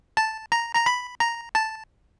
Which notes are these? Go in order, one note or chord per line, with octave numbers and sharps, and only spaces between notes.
A5
A#5
A#5
B5
A#5
A5